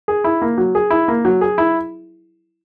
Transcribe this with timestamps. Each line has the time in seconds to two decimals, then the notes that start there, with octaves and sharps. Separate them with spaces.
0.08 G#4
0.24 E4
0.42 A#3
0.58 F#3
0.75 G#4
0.90 E4
1.08 A#3
1.25 F#3
1.41 G#4
1.58 E4